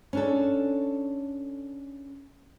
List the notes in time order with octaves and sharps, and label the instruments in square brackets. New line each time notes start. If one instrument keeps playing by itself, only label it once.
[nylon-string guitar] C#4 D4 A4